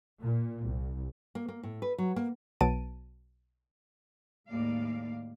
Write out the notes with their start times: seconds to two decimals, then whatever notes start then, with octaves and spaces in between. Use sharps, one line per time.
0.22 A#2
0.66 C2
1.35 A#3
1.48 A#3
1.63 A2
1.82 B4
1.98 F#3
2.16 A#3
2.61 B1 F#3 B3 A5 D7 D#7
4.48 D#2 A2 G#3 A#3 D5 F5